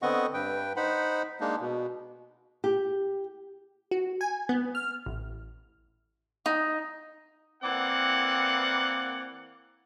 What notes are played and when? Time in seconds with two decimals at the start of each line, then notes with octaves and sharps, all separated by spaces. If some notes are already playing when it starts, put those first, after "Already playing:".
0.02 D3 B3 C4 D#5 F#5 C#6
0.34 G2 B4 G5
0.76 D#4 C5 F#5 B5
1.40 G#3 A#3 D4 D#4
1.61 B2
2.64 G4
3.91 F#4
4.21 G#5
4.49 B3
4.75 F6
5.06 A1
6.46 D#4
7.63 E3 A#3 C4 D5 F#5